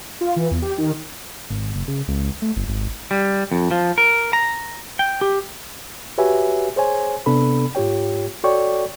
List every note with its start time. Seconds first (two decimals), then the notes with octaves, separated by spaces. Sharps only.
0.21 F4
0.36 E3
0.51 E2
0.62 G4
0.78 D#3
1.50 G#1
1.74 F#1
1.88 C#3
2.08 C#2
2.42 A3
2.56 G1
2.68 G#1
3.11 G3
3.52 F2
3.71 F3
3.98 A#4
4.33 A#5
4.99 G5
5.21 G4
6.18 F#4 G4 B4 C#5 E5 G#5
6.76 G#4 C5 C#5 G#5
7.26 C3 B3 D4 A4 B5
7.75 G#2 F4 G4 C#5 G5
8.44 F#4 A4 C#5 D5 G5 C#6